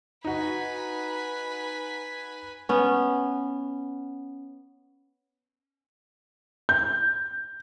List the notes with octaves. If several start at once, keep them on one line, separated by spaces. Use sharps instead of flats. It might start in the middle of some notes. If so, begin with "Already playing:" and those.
D#4 F#4 B4 G#5
B3 C#4
G6